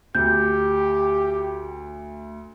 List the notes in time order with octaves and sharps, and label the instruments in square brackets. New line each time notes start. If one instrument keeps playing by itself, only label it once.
[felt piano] D2 [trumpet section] G4 [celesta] G6